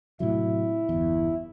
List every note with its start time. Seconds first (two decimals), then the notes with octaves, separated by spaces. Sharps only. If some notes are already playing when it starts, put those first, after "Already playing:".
0.20 A2 C3 F#3 E4
0.89 G1 E2